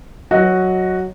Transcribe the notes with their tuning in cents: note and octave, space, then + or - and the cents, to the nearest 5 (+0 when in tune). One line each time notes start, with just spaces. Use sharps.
F#3 +0 F#4 +0 D#5 +10